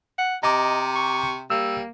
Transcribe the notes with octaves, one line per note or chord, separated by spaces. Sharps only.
F#5
C3 D#5 A#5 D6
C#6
G3 A#3 E6